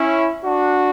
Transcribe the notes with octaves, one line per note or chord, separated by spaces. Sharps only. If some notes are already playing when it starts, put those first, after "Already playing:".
Already playing: C#4 E4
D4 F#4